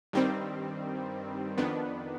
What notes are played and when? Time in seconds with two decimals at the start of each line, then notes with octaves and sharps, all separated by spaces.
0.13 G2 D#3 G3 C4
1.58 F2 D#3 B3 D4